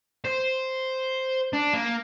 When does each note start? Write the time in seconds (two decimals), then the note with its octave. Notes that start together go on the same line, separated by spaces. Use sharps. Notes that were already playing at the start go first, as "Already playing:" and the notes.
0.25 C5
1.53 D4
1.73 A#3